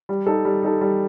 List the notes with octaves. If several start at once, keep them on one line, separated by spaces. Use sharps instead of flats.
G3
D#4 A4
G3
D#4 A4
G3